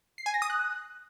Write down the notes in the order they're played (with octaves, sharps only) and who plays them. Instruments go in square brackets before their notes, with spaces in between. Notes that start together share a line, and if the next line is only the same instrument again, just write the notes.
[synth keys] C7
G#5
A#6
D#6
F#6